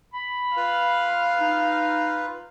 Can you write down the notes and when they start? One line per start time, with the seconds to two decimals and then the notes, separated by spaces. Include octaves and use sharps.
0.13 B5
0.57 F4 B4 F5
1.40 D#4